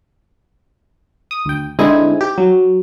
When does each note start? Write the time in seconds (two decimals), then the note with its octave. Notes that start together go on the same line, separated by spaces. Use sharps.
1.31 D#6
1.46 D2 G5
1.79 D3 G#3 C4 D#4 E4 G#5
2.21 G4
2.38 F#3